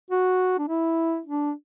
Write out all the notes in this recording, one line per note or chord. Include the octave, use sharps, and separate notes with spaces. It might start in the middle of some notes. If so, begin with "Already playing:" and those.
F#4
D4
E4
D4